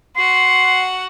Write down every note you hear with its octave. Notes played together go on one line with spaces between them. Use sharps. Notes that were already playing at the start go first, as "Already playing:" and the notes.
F#4 F#5 C6